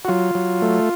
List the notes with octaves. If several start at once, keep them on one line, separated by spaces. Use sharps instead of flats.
F#4
F#3 F4
F#3
A3